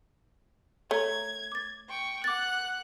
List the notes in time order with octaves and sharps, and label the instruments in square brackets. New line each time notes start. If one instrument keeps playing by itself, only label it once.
[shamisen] A3 [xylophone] C#5 A#5 [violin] G#6
[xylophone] D6 A6
[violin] G5 C#6
[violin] F#5 F#6 [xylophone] D6 A6